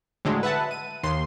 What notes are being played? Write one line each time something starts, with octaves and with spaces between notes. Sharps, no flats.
A2 D3 F#3 G#3
B4 E5 F#5 A5
D#7
D#2 C6